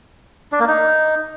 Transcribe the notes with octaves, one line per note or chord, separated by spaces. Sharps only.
D4
A#3
D#4